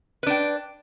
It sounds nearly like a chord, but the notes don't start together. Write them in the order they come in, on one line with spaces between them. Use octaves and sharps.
B4 D4 G5